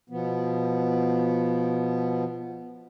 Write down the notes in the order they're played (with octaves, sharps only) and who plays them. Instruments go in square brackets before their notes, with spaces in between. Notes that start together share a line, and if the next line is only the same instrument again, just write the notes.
[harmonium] B2 F3 B3